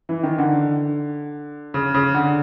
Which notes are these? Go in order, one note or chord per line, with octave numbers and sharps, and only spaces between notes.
E3
D#3
D3
C#3
C#3
D3